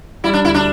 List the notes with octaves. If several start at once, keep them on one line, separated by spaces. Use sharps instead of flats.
G3 E4
D4
D2 E4
D4